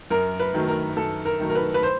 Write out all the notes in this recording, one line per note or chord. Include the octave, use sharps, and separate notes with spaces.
F#2 A#4
B4
D#3 F#3 A3
A#4
F#2 A4
A#4
D#3 F#3 A3
A#4
B4
B4
C5